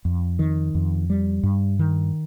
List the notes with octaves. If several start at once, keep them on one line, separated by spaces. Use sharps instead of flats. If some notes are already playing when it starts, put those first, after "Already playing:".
F2
D#3
F2
G3
G2
D#3